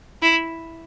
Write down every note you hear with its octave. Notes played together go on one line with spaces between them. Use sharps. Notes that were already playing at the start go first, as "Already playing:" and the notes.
E4